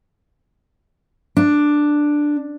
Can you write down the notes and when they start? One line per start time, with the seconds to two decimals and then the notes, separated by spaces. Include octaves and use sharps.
1.37 D4